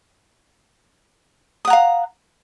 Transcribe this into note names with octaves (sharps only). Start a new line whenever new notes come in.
F5 F#5 A#5 D#6